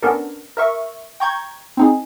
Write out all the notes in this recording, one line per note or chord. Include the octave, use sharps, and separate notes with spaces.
B3 C#4 D4 A4 A#4
A#4 E5 C#6
G5 A#5 C#6 G6 G#6
C4 D#4 G#4